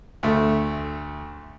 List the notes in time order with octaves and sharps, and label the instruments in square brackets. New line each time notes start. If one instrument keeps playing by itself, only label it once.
[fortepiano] D2 A3